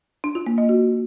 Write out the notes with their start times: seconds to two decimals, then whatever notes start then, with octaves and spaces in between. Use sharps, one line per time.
0.24 D4
0.35 F4
0.47 A#3
0.58 D#5
0.69 F#4